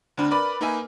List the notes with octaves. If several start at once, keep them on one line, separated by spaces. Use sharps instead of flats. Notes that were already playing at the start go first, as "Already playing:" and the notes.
D2 C4 D4 B5 F6
A#4 B4 D5 B5
A#3 D#4 A#4 B4 E5 G#5